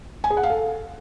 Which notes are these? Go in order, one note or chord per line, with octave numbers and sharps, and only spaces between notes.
G#5
G#4
F#5
F5
A4